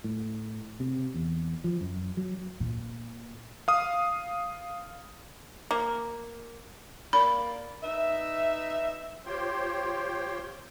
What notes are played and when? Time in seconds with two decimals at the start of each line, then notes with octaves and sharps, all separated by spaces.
0.04 A2
0.80 C3
1.14 E2
1.64 F3
1.81 F#2
2.17 F#3
2.60 A#2
3.68 F5 D#6
5.71 A#3
7.13 A#3 D5 B5
7.83 D#4 B4 E5
9.26 F4 G4 C5 C#5 G5 C6